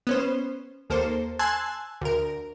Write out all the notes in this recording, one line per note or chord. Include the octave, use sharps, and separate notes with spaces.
B3 C#4 C5
D#2 A#3 A4 C5
G#5 A5 C6 E6 F#6 G#6
D2 A#4